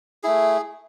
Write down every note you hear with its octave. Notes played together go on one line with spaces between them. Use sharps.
A3 E4 G#4